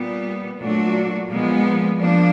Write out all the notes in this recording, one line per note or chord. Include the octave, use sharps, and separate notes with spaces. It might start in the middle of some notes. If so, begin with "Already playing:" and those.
Already playing: A#2 G3 B3
A#2 F#3 A3 D4 F#4
A#2 F3 G#3 B3
F3 A#3 D4